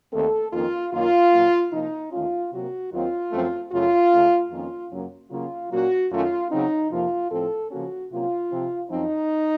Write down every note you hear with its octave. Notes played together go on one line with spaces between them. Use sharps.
D#2 D#3 A3 C4 A4
F2 D#3 A#3 C#4 F4
F#2 D#3 A#3 C#4 F4
A#2 F#3 A#3
C3 F3 A#3 D#4
D#2 D#3 A3 C#4 F4
C3 F#3 A#3 F#4
D#2 D#3 F#3 C4 F4
F#2 F3 A3 C4
F#2 C#3 A3 C#4 F4
C#3 A3 C#4
F2 D#3 A#3 C#4 F4
F#2 C#3 F#3 A#3 C#4
C#3 F#3 A#3 C#4 F4
A#2 F#3 A#3 C#4 F#4
F#2 D#3 A3 C#4 F4
C#3 F#3 C4 D#4
F2 C3 F3 A#3 F4
A2 F3 C4 A4
C#3 F3 A#3 C#4 F#4
C3 F#3 A#3 C#4 F4
C3 F3 C4
F#2 F3 C4 D#4